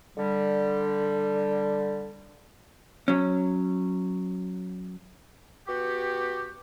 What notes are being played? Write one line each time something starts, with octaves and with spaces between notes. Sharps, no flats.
D3 G3
F#3 C#4
B3 F#4 G4